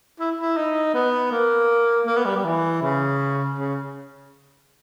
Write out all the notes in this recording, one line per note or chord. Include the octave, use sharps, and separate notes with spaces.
E4
E4
D#4
B3
A#3
A#3
B3
G3
G3
E3
C#3
C#3